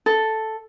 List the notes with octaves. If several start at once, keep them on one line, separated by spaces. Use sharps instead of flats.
A4